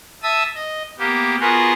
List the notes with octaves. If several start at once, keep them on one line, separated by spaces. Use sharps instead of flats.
E5 A5 D#6 E6
D#5
A#3 B3 G4
B3 F4 F#4 G#4 A#4 B4